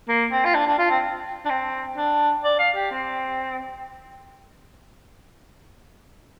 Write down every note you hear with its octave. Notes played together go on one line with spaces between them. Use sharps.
A#3
C4
F4
D4
D4
F4
C4
D4
C4
D4
D5
F5
G4
C4